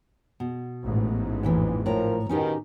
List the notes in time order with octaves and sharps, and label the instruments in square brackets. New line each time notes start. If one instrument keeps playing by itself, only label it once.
[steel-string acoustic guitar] B2
[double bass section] A1 G#2
[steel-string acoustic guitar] F2 A#2 E3
[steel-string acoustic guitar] A2 C#5 A#5 [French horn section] F3 A#4
[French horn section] B2 D#3 [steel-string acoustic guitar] C#4 D#4 G4